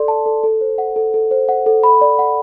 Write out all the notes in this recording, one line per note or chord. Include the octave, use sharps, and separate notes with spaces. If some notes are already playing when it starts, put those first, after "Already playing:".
Already playing: A4 D5 C6
A5
A4
A4
C5
F#5
A4
A4
C5
F#5
A4
B5
D5
F#5